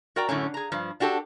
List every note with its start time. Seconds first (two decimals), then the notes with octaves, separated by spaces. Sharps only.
0.16 F#4 A#4 D5 G5 A#5
0.29 F#2 A2 D3 C#4
0.54 G#4 A#5
0.72 G2 F3
1.00 D4 F#4 G4 A4